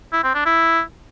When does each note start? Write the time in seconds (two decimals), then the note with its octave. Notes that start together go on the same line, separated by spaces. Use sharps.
0.12 E4
0.24 C4
0.35 D4
0.46 E4